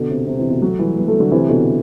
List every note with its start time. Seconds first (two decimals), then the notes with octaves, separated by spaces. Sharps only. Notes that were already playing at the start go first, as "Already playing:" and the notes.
Already playing: B2 D3
0.10 C3
0.27 C3
0.39 C3 E3
0.50 B2 D3
0.62 F#3 A3
0.79 E3 G3
0.97 G3 B3
1.08 F#3 A3
1.20 D3 F#3
1.32 C3 E3
1.49 B2 D3